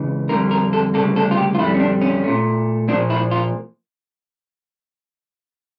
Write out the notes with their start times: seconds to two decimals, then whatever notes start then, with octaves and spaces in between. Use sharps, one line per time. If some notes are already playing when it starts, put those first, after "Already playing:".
Already playing: C#2 C#3 E3
0.29 F2 D3 G3 A#3 A#4
0.51 A#4
0.73 A4
0.94 D2 C#3 G3 A#3 A4
1.16 A4
1.31 F4
1.37 G4
1.54 F4
1.58 F2 D3 G3 E4
1.74 C#4
1.80 D4
2.01 C#4
2.24 A#2 A3
2.88 A#2 F3 A#3 D4
3.10 E4
3.31 F4